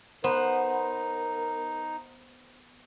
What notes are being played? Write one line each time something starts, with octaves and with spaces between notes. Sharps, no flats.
B3 D#4 A#4 C5